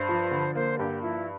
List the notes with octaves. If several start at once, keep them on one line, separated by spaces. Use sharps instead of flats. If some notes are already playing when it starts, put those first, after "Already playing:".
Already playing: G2 C5
F3
D3
A#3 C5
G2 G4
F3 E4